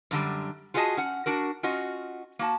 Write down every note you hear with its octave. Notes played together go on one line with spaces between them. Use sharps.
F#2 D3 G3
F4 F#4 G#4 A4 D#5 A5
C#4 F#5
D4 F#4 A#4
C#4 F4 F#4 D#5
A#3 F#4 A5